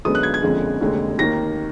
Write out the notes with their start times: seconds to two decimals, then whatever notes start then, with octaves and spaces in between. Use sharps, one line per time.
0.05 F#2 D3 G#3 B3 D#6
0.15 F#6
0.23 G#6
0.34 G#6
0.42 F#1 F2 D3 F3 G#3
0.80 F1 D#2 D3 G#3
1.18 D#2 D#3 A#3 A#6